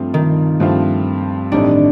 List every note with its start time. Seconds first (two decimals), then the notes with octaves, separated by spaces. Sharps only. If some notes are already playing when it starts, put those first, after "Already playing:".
Already playing: G2 F3 A3 C4 F4
0.14 D#3
0.60 G2 F3 A3 C4 F4
1.52 A1 A2 G3 C4 D4 D#4